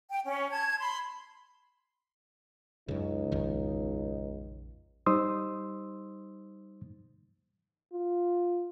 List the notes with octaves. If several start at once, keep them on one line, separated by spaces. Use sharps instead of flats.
G5
C#4
A5 G#6
B5 C6
C#2 F#2 C#3 D#4
A#1 F2 D#3
G3 D#4 C5 C6 D#6 E6
F4